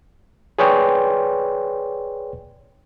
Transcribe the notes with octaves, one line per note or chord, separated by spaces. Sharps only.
G#4 B4 C#5 D5 G5 C6